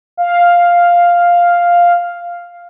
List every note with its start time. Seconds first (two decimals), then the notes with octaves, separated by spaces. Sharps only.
0.17 F5